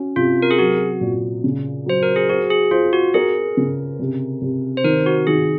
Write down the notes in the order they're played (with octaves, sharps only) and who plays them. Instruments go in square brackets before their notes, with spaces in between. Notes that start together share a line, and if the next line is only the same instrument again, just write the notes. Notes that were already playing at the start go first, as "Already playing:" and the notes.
Already playing: [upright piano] C#4 F#4
[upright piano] C3 [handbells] F4
[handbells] A#4
G#4
[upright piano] F#3 [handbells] F#4
[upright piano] A#2
C#3
[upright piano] F#3 [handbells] C5
[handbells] A#4
G#4
[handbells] F#4 [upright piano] C5
[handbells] G#4
[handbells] F4 [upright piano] C5
[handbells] F#4
[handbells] G#4 [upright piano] A#4
[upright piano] C#3
C3
C3
[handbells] C5
[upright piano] D#3 [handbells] A#4
[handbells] F#4
[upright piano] D#3 [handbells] G#4